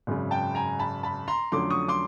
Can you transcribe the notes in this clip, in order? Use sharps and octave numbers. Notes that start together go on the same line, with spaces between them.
G#1 F#2 C#3
G5 A5
G#5 A#5
A5 B5
A5 B5
A#5 C6
F2 D3 F#3 A3 C#4 C6 D6
C#6 D#6
C6 D6